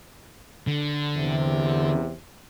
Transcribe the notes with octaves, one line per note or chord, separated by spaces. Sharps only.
D3
E2 C3